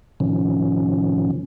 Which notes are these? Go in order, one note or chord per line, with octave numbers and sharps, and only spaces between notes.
A2 C3 D#3 F3 C#4